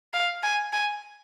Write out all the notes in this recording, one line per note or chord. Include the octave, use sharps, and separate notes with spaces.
F5
G#5
G#5